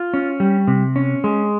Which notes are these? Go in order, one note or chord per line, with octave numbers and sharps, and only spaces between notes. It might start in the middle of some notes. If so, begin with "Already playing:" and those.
Already playing: F4
C#4
G3
C3
C#4
G#3